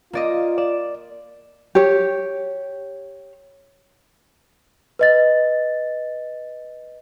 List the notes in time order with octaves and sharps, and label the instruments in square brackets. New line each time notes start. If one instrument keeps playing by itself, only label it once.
[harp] A#3 D5 D#5 [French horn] F4
[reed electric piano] D5 [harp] E7
[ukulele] G4 C#5
[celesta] B4 D#5 A6